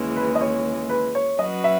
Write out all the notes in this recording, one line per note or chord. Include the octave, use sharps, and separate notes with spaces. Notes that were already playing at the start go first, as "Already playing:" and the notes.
Already playing: D#2 C#3 E3 G#3
B4
D#5
C#5
B4
C#5
F#3 C#4 F#4 B4 D#5
E5